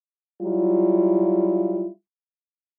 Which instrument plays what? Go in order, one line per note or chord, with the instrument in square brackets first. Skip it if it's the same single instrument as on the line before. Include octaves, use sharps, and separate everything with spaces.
[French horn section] F#3 G3 E4 F4